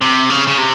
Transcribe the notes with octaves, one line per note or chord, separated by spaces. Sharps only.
C3
C#3
C#3
C3